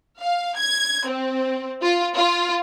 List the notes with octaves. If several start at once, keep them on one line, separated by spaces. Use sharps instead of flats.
F5
G#6
C4
F4
F4